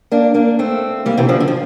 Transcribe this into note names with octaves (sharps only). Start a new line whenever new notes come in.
A#3 D4
A#3 D4
A3 C4
G3 A#3
C3 E3
D3 F3
D3
F3